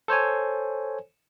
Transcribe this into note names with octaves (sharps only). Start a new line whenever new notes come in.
A4 C5 C#5 G#5